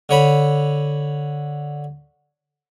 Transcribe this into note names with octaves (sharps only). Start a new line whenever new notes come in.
D3 C#5 B5